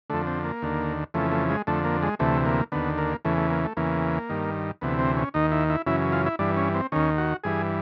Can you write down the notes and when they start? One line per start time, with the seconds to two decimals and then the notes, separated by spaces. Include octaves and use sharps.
0.10 F2 D3 A3
0.27 C4
0.44 A#3
0.62 D#2 D3
1.14 F2 C#3 E3 A3
1.32 A3
1.50 G#3
1.67 F2 D3 A3
1.85 A#3
2.03 G#3
2.19 D2 C3 E3 A3
2.46 A#3
2.72 D#2 D3 B3
2.98 A#3
3.25 E2 C#3 E3 A3
3.37 A3
3.51 A#3
3.64 A3
3.77 E2 C#3 E3 A#3
4.29 G2 D#3
4.81 D2 C3 E3 B3
4.99 C4
5.17 C#4
5.34 D#2 D#3 D#4
5.52 E4
5.70 E4
5.86 F#2 C#3 E3 E4
6.12 F4
6.26 E4
6.39 G2 E3 D4
6.57 C#4
6.75 C4
6.92 D#2 D#3 C#4
7.18 F#4
7.44 G2 E3 G#4